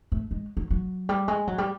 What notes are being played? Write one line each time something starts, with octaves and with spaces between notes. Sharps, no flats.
A3
G#3
F#3
F#3
G3
G#3
F#3
G3